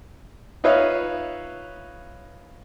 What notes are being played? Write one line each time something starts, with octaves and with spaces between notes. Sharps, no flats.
D#4 F4 B4 C#5 E5 F5